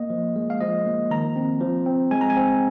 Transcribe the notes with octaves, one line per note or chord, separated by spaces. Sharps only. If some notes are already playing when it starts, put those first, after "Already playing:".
Already playing: A#3 D#5
F3
G#3
F5
F3 D#5
A#3
D#3 A#5
C4
F3
C4
G#3 G#5
A#5
G#5
C4